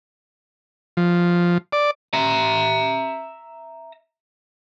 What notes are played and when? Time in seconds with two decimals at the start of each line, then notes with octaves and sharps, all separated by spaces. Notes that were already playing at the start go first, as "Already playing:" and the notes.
0.97 F3
1.73 D5
2.13 E5 A#5